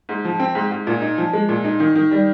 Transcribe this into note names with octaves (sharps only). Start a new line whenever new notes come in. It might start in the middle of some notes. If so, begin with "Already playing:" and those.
G#2
F3
C4
G#2
G#2
A#2
D#4
F3
G#3
A#2
D#4
D#3
D#3
G3